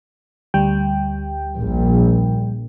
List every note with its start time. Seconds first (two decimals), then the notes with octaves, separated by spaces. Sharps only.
0.54 D2 G3 G5
1.59 A#1